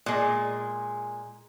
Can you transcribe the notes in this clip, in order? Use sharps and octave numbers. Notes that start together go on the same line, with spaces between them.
A#2 G#3